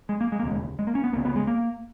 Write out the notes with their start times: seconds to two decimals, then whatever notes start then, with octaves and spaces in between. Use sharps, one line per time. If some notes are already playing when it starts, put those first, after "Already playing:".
0.09 G#3
0.21 A#3
0.32 G#3
0.39 A#3
0.43 E1 D#2 C#3 G#3
0.79 G#3
0.87 A#3
0.95 C#4
1.04 B3
1.12 C#2 A#3
1.17 C#3
1.25 B3
1.36 G#3
1.47 A#3